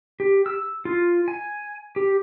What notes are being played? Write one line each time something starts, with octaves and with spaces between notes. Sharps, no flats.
G4
E6
F4
G#5
G4